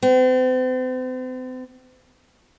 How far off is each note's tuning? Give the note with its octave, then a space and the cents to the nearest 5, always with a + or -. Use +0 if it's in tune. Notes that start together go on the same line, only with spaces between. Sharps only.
C4 -40